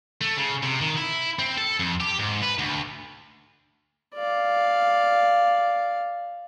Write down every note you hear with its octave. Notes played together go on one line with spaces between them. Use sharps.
A3
C#3
C3
D#3
E4
C4
A4
F2
G4
G#2
B4
D2
D5 F5